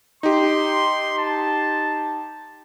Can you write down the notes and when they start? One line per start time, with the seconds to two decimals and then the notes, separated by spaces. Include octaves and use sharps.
0.23 D#4 G4 C6
1.19 A5